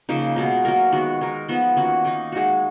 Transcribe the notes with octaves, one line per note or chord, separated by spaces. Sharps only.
C#3 F3 A#3 D#4
B2 G#3 D#4
F#3 A#3 F4 A#4
D#3 G#3 B3 F#4
G#3 D#4 A#4
F3 B3 D#4
D#3 A#3 C#4 F#4
D#3 A#3 D#4
G#3 D#4 F#4